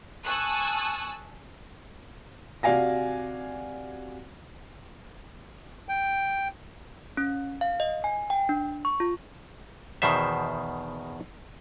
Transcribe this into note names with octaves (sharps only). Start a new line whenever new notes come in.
G#5 A5 C#6 D#6 E6 F#6
C3 F#4 D5 F5 G#5 A#6
G5
C#4
F5
D#5
G#5
G5
D4
C#6
F4
E2 B2 D#3 C5 E5